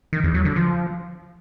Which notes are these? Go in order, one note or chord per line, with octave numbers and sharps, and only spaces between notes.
D#3
E2
F#3
D3
F3